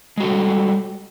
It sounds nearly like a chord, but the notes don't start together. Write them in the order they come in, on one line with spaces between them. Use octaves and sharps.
G#3 F#4 A4 G3